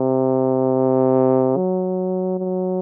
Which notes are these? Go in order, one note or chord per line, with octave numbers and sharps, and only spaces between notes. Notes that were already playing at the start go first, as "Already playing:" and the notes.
Already playing: C3
F#3
F#3